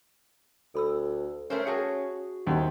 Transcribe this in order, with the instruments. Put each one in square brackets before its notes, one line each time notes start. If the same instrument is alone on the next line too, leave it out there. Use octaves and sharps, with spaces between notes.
[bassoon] D2 [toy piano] A4 B5 E6
[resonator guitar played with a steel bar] A3 A#4 C5 [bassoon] C#4
[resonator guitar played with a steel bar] F#4 G#4 [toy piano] G5 A5
[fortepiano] D#2 [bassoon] C3 [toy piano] E4 F#5 C6